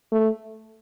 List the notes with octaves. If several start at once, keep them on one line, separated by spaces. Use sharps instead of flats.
A3